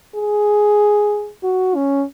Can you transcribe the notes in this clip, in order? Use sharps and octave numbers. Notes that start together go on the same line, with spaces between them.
G#4
F#4
C#4